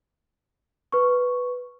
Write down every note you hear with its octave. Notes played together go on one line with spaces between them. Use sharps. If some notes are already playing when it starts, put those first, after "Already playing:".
B4 C#6